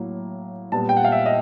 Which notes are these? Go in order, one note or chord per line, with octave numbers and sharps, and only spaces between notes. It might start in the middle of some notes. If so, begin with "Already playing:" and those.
Already playing: A2 F#3 A#3
A#2 G3 B3 A5
G5
F#5
F5
E5
D#5